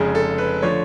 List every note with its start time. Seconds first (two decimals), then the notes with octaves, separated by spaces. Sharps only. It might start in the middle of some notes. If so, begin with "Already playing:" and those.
Already playing: F1 F2 C#3 G#3
0.15 A4
0.38 B4
0.62 D3 F3 A3 C#5